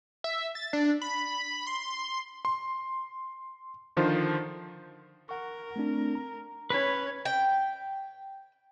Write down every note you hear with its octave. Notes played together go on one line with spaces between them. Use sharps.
E5
A6
D4
B5
C6
C6
D3 D#3 F3 F4 C5
A#4 F#5 C#6
A3 C4 D4
A#5
C#4 B4 C#5 B5
G5